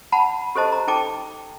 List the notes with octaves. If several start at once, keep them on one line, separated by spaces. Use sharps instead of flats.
F#5 A5 B5
G4 A4 C5 D#5 A5
A#5
D#4 A4 G5 A5 D6